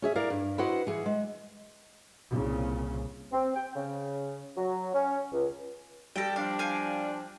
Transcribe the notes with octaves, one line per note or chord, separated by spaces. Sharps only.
C#4 G#4 E5
E4 A#4 D5 F5
G2
E4 F#4 B4 C5 D#5 F#5
E3 G#4
G#3
C2 A#2 C#3
C4
G5
C#3
F#3
C#4
C#2
G3 G4 A4 G5 A#6
F3 D4 F5
F5 G5 G#5